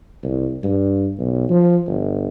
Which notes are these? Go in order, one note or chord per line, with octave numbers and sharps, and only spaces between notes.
C2
G2
B1
F3
G1